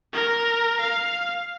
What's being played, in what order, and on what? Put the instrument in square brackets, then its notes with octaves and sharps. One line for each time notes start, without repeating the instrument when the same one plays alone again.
[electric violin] A#4
F5